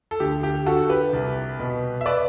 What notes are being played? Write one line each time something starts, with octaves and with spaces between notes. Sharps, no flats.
A4
D2 G4
G4
D3 F#4 A4
G4 B4
C2
B2
E5
B4 D5